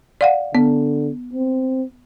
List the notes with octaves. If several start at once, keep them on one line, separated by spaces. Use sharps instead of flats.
D5 F5 F#5
D3 B3
C4